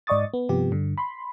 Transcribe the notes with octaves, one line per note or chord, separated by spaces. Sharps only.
G#2 D5 D#5 C#6 D#6 A6
B3
G2 C3 F3 B3 G4
G2 D3
B5 C6